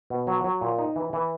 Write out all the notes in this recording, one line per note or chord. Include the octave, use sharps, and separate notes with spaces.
B2
F#3
F#3
A#2
D#4
E3
E3